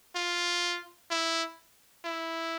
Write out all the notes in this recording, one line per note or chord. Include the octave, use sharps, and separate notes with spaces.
F4
E4
E4